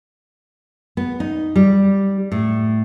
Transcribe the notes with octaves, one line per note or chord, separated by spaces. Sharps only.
B3
D#4
G3
A2